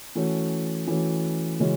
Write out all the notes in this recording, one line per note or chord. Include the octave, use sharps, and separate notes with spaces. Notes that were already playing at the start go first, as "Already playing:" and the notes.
E3 A3 C#4 F#4
E3 A3 C#4 F#4
C#3 E3 G#3 C#4 F#4